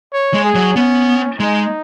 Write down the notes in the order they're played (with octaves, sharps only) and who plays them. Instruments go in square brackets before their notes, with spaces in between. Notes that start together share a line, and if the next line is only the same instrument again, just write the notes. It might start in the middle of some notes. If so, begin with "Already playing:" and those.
[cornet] C#5
[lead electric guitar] G#3
[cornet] G#4
[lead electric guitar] F#3
[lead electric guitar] B3 [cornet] C#4
[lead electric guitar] G#3 [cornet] D#4